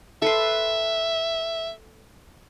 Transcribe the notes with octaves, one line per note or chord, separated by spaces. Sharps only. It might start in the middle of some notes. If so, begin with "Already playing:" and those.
A4 B4 E5 C6